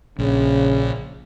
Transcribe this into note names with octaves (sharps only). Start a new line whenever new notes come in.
A#1 C#3